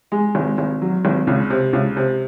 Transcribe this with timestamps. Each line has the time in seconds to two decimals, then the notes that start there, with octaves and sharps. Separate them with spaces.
0.12 G#3
0.35 G#1
0.58 G#1
0.82 F#3
1.05 G#1
1.27 C#2
1.50 C3
1.73 C#2
1.97 C3